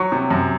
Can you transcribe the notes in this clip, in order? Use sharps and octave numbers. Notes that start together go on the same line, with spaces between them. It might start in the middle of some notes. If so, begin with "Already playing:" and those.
Already playing: F#3 C#6
C3
F#2